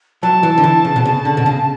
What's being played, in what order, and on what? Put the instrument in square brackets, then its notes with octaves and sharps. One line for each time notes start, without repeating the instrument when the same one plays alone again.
[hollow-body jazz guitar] F#3 [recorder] A5
[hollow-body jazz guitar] E3
D3
E3
C#3
B2
C#3
D3
B2
C#3